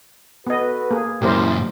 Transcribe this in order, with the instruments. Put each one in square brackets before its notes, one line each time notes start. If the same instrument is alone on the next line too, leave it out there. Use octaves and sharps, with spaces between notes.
[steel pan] B3 D#5 [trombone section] F#4 A4 B4
[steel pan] A#3 G#4
[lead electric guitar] F#2 A#2 [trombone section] E4 [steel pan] G4 A#4 C5